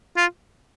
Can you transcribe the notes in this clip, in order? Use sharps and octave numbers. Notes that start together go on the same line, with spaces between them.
F4